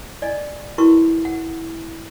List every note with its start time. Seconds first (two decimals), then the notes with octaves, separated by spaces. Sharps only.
0.22 D5 D#5 G#5
0.78 E4 F#4 A#4 B4 C#6
1.25 F#5